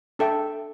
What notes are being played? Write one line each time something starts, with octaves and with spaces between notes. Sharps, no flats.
D4 A4 E5 G5